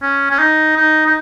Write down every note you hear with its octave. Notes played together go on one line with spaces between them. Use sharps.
C#4
C#4
D#4
D#4
D#4